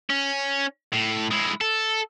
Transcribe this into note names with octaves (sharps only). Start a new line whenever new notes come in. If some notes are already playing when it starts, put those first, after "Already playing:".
C#4
A2
G#3 E4
A4